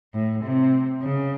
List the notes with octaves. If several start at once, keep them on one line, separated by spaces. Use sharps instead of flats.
A2
C3
C#3